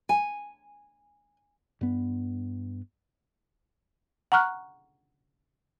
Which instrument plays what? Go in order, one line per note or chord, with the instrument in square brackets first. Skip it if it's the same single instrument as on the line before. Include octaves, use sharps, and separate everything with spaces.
[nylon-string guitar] G#5
[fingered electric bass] G2 B3
[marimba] F#5 A#5 C#6 F6 F#6